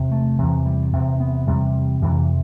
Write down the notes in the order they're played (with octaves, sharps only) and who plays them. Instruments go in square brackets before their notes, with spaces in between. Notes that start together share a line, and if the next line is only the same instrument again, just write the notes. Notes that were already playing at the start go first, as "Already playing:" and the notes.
Already playing: [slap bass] E2 C3
A3
E2 C3 E3
G3
E2 C3 C4
B3
E2 C3 G3
F2 C3 E3